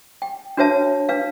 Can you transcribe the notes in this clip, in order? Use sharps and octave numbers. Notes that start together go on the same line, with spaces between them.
G5
D4 F#4 B4 C#5 E5 A5
D4 B4 F5